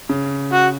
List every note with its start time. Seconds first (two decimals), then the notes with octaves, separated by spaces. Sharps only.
0.09 C#3
0.53 F#4